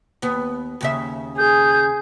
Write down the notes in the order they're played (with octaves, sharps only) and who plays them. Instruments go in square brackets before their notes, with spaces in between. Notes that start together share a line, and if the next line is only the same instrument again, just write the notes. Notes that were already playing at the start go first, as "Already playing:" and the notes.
[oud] D#2 B3
D#2 C#3 E5
[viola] G#4 [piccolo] G6